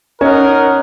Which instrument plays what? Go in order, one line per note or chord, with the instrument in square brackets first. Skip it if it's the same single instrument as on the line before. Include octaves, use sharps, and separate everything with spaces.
[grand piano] C#4 C#5 [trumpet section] D#4 A#4 D#5 F#5